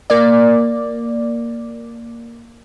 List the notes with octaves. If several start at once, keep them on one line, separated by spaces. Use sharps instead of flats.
A#3 D5